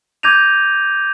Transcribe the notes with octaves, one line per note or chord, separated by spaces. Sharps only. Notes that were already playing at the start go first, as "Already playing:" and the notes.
D6 G6 G#6 A#6 D#7 F7